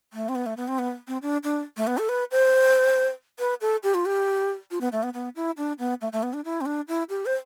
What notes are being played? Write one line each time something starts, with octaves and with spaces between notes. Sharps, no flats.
A3
C4
B3
A3
B3
C4
B3
C4
D4
D4
A3
B3
A4
B4
C5
B4
A4
G4
F4
G4
F4
B3
A3
B3
B3
E4
D4
B3
A3
A3
B3
D4
E4
C4
D4
E4
G4
C5